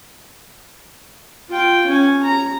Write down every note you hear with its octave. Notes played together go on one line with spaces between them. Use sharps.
F4 G5
C#4 G#5
A#5